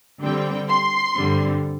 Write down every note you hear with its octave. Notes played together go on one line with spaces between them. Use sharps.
D3 G3 C4 G5
C6
G2 D3 G3 C4